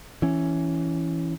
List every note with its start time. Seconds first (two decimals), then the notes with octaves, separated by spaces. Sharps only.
0.22 E3 C#4